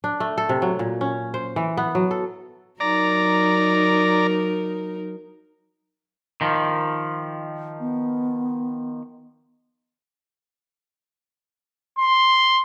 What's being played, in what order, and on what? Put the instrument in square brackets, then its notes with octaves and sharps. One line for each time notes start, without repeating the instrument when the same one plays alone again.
[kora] D4
A3
A4
C3
F#3
A#2
C#4
C5
E3
B3
F#3
A4
[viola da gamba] F#3 D#4 A#4 [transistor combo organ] D5 A#5
[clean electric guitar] D#3 F3
[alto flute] B3
[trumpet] C6